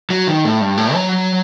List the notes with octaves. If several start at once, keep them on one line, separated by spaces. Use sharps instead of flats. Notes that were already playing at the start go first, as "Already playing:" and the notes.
F#3
D#3
A2
G2
A2
F#3